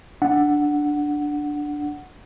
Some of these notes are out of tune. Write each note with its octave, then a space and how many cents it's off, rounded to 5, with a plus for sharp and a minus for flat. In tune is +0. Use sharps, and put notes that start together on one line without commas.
D4 +0 F#5 +0